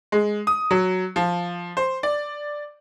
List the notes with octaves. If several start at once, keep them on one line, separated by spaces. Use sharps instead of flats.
G#3
D#6
F#3
F3
C5
D5